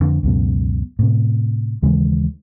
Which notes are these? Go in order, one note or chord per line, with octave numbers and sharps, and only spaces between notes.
F2 D3
C#2 F#2 B2
A2 C3
D#2 C#3 E3 G#3